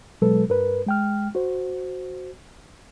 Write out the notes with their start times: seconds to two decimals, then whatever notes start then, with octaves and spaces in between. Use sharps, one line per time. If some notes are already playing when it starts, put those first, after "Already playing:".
0.22 B2 F#3 G#3 A4 B4
0.49 G2 A#4 B4
0.86 G#3 G5 F6
1.35 F#4 C5